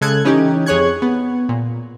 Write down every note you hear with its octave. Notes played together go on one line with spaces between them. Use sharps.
C#3 G#3 A4 F#6 G#6
E3 C#4 D#4 G4
F2 G#4 C#5 C#6 F#6 G#6
B3
A#2